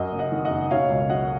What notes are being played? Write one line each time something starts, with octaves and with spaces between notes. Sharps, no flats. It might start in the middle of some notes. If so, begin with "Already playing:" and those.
Already playing: F#2 D#5 F#5
F#1
D#5 F#5
D#3
D#5 F#5
F#1
B2 C#5 F5
C#2
F#3 D#5 F#5